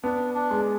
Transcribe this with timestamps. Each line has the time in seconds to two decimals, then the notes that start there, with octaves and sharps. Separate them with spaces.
0.03 B3 D4
0.35 D4
0.51 G#3